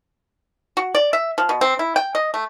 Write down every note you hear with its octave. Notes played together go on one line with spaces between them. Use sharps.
F#4
D5
E5
F3
B2
C4
E4
G5
D#5
A3